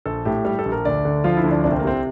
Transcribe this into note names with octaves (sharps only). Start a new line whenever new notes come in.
A#1 A4
A2 G4
G3 G4
A4
A#1
A#4
D2 D5
D3
F3 F4
E4
D2
D4
C2 D4
C4
A#3
C3 C4